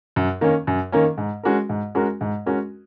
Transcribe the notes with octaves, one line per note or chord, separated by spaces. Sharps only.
F#2
D#3 A#3 C#4
F#2
D#3 A#3 C#4
G#2
G#3 C#4 F#4 A#4
G#2
G#3 C#4 F#4 A#4
G#2
G#3 C#4 F#4 A#4